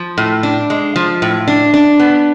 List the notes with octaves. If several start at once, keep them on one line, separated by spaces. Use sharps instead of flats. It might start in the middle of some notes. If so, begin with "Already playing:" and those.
Already playing: F3
A2
D4
G#3
F3
A2
D4
D4
B3